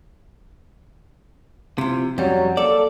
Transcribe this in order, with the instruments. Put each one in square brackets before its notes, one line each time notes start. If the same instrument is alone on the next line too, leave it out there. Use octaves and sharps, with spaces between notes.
[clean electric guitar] C3 [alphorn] F3 [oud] E4 F4
[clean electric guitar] F2 G3 [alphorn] F#3 [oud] C#4
[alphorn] A#3 [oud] A4 [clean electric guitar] D5